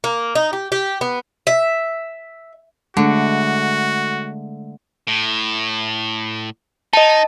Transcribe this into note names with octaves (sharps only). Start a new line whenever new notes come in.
A#3
D#4
G4
G4
B3
E5
D3 G#3 A3 F#4
A2
D#4 D#5 A5